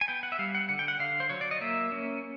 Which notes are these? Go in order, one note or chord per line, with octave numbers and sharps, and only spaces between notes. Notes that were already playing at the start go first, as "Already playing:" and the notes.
G#5
B3 G5
F#5
E5
G3 F5
F#5
D3 F#5
G5
F#5
D3 F5
C5
F#3 C#5
D5
D#5
A#3 E5
C#4